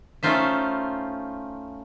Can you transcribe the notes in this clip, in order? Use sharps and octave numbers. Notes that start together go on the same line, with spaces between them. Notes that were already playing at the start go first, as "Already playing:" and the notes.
A3 C#4 D#4 F4 C5 E5